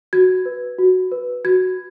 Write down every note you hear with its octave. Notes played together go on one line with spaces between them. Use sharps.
F#4 G#6
B4
F#4
B4
F#4 G#6